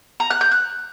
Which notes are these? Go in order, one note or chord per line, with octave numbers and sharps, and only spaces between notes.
A#5
F#6
G6
F#6